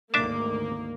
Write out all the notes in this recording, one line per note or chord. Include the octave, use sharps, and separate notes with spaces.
G#1 D2 D#3 A#3 D4 E5 A5 D6